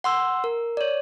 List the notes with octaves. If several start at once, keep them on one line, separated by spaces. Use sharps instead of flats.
F#5 C6 E6
A#4
C#5 D5